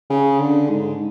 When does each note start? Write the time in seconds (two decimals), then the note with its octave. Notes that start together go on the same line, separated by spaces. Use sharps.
0.10 C#3
0.39 D3
0.69 G#2